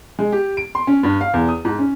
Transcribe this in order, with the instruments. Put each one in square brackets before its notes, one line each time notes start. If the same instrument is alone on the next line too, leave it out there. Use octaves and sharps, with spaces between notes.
[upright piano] G#3
G4
D7
C6
C#4
G2
F5
E2
D#6
G#2
C#4